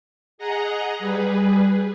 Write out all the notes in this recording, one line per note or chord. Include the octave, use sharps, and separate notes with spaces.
G#4 D#5 F#5 A#5
G3 G#4 B4